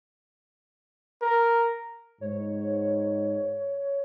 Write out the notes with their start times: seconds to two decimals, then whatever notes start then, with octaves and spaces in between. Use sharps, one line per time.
1.22 A#4
2.21 G#2 C#5